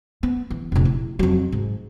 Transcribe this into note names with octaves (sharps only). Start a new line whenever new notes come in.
B3
E3
F1 A#1
E4
F2 F#3
G#2